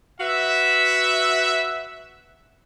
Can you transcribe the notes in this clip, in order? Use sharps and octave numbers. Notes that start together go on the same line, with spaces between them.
F#4 B4 E5